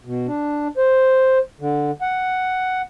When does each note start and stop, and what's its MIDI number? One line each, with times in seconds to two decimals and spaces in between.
0.05 0.27 47
0.27 0.68 62
0.77 1.38 72
1.60 1.91 50
2.01 2.81 78